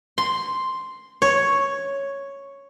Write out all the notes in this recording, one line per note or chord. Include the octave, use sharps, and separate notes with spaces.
C6
C#5